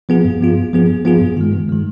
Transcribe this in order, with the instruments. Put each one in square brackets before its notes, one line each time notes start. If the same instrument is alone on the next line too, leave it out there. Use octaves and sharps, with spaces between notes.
[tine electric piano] F3 B3 F4 G#4
G2
F3 B3 F4 G#4
G2
F3 B3 F4 G#4
G2
F3 B3 F4 G#4
G2
D#3 G#3
G2
D#3 G#3